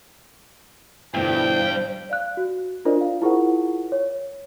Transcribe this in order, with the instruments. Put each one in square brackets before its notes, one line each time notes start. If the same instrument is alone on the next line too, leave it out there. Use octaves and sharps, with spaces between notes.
[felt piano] G1 B2 E3 [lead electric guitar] G2 [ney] C5 [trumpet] G5
[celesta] D5 F5 F#6
F#4
D4 F4 A#4 C5 D5 D#5
F5
E4 F4 G#4 A#4 C5 F#5
C#5